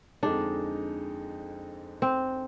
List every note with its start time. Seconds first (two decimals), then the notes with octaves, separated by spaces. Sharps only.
0.23 F2 D3 G#3 D4 D#4
2.02 C4